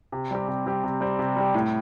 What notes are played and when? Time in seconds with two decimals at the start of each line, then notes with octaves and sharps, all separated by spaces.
0.12 C3
0.31 G3 C4 G4
0.48 C3
0.66 G3 C4 G4
0.84 C3
1.01 G3 C4 G4
1.19 C3
1.36 G3 C4 G4
1.54 A2